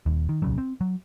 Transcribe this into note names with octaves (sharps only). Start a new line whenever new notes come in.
D#1 D#2
D#3
D1 B1 C#3 F#3
C4
F#3